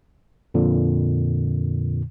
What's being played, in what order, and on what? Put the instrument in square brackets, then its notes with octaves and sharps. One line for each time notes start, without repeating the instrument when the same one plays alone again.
[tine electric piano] F2 A#2 D3